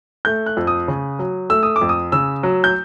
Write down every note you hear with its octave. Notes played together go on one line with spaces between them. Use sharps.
A3 G6
F#6
F2
D#6
C#3
F#3
A3 E6
D#6
D6
F2
D#6
C#3 E6
F#3
G6